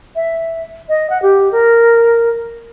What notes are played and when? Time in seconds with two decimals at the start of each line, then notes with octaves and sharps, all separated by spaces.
0.16 E5
0.89 D#5
1.10 F#5
1.22 G4
1.52 A#4